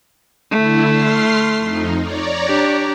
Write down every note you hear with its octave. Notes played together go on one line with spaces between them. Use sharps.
D3 A3 E4
C6 F6 C7
F2 D#4
C#5 D5 A#5
D4 G4